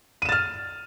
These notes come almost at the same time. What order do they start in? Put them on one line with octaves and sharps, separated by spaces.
D#7 E7 A6 F6